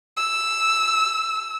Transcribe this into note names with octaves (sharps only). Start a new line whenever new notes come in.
E6